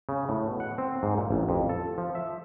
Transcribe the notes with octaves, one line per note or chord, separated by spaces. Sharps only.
C#3
A2
B2
F#5
C4
G#2
A#2
A1
F2
A4
F3
E5